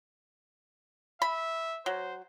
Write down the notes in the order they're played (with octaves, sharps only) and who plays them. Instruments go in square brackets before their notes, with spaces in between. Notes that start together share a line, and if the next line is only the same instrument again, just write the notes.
[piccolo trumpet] E5 [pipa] B5
[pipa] F#3 [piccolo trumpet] C5